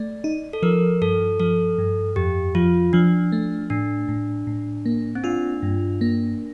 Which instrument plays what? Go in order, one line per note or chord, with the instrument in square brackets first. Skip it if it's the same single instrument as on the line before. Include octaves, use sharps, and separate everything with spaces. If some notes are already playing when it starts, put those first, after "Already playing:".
Already playing: [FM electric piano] A3 [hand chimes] D5
[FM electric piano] D#4
[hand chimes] A4
[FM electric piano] F3 [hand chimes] A#4
[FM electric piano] G2 [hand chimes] A4
[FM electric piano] F3 [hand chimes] A4
[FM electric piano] G2
[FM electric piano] F2 [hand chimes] G4
[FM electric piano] F3 [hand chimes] F4
[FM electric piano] F3 [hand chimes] D4
[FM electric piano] A3
[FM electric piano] A2 [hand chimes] D4
[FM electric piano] A2
A2
A#3
[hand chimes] C4
[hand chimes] D4 [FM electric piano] F4
[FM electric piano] G2
A#3